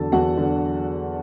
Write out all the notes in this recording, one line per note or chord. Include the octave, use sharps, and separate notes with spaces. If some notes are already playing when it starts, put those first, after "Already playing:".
Already playing: E2 D3 F#3 A4 A5
E2 F#4 F#5
D3 F#3